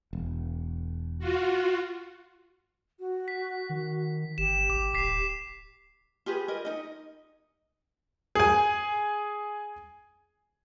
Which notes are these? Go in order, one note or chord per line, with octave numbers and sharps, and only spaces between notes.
E1
F4 F#4
F#4
B6
D#3
G1 G4 E7
G#1 D6
D1 D6 B6 C7
F4 G4 G#4 B4
A#4 D#5
D#4 D#5
G#4 G#5